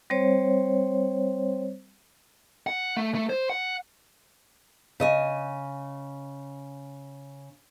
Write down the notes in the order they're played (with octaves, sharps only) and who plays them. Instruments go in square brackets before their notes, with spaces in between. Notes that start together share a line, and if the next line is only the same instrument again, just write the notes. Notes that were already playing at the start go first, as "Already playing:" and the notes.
[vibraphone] G3 C4 C5 C#5
[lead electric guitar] F#5
A3
A3
C5
F#5
[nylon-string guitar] C#3 D#5 G#5